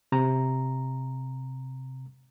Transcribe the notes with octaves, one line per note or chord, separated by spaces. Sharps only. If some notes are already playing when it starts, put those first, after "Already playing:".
C3 A#5